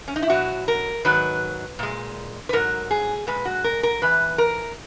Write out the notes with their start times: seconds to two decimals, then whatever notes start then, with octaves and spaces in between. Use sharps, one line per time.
0.08 C#4
0.16 D#4
0.22 E4
0.30 B2 F#3 F#4
0.68 A#4
1.05 G#2 D#3 F#3 B4
1.79 A#2 G#3
2.49 B4
2.53 G#2 F#3 A#4
2.91 G#4
3.27 A#2 G#3 B4
3.45 F#4
3.64 A#4
3.83 A#4
4.02 G#2 E3 B4
4.38 A#4